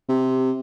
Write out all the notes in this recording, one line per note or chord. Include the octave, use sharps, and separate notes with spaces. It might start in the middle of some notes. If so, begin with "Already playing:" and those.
C3